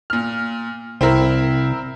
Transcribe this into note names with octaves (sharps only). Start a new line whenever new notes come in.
A#2 F6
C2 C4 E4 A#4